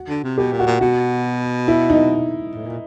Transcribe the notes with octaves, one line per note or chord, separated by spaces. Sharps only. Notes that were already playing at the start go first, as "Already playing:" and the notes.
Already playing: F#4
D3
C3
B2 G4
A#2
F#4
A#2
B2 F#4
E4
D#4
A2
A#2